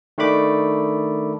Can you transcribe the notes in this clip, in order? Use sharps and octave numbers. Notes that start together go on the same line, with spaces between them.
D#3 A3 D4 B5 D6